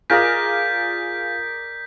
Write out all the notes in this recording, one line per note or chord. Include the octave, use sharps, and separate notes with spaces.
F4 G#4 A#4 D5 D#5 G6 B6